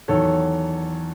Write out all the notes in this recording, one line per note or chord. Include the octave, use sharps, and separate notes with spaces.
E2 D#3 F#3 A4 C#5